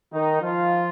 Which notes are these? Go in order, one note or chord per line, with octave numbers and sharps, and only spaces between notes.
D#3 D#4
F3 F4